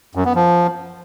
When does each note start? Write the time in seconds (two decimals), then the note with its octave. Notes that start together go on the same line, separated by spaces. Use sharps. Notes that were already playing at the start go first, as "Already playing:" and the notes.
0.15 F#2
0.25 B3
0.35 F3